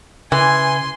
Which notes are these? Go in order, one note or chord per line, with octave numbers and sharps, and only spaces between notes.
C#3 E3 G#5 C6